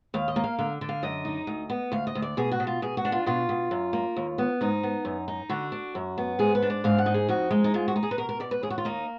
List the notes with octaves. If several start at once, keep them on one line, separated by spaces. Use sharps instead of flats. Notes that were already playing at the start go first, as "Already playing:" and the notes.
D#2 F5
D#5
A#3
F5
D3 F5
D3
F5
F#2 D#5
D#4
D2
B3
D2 F5
D#5
D2
D5
B2 G#4
F#4
B2
F4
B2 G#4
F#4
D4
F4
B2 F4
B2
F#2
A#3
D#2
B3
G#2 D#4
B3
F#2
D#4
D3 F#4
D4
F#2
B3
G#2 G#4
B4
D4
D5
G#2 F5
F#5
D#4
G#4
F2 F#4
G#3 D#4
D#4
G#2 F4
F#4
D#4
G#4
B4
B2 A#4
A#4
B2 D5
B4
D#2 G#4
F#4
F4
A#3 D#4